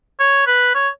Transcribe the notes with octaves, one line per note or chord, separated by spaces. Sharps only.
C#5
B4
C#5